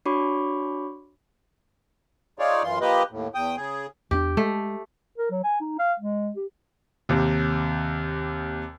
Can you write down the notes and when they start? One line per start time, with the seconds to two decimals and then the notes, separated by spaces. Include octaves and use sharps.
0.05 D4 F#4 C#5 B5 C#6 D6
2.39 D#4 F4 G#4 C#5 D5
2.63 F#2 E3 F4 C6
2.81 F3 A#3 G4 B4 D#5
3.11 D#2 A2
3.35 E2 G5 D#6
3.57 C#3 G#4
4.11 E2 C4 D4 G4
4.37 G#3 A3
5.18 A#4
5.31 F#3
5.44 G#5
5.60 D#4
5.79 F5
6.00 G#3
6.36 G4
7.09 D#2 C3